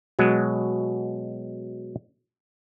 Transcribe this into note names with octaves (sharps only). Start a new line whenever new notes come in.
B2 F#3 G#3